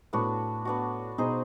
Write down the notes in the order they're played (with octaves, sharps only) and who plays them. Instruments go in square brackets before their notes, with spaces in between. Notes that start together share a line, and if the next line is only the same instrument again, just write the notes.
[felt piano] A2 [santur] B3 D4 F#4
[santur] B3 D4 F#4
[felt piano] B2 [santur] D#4 G#4 C5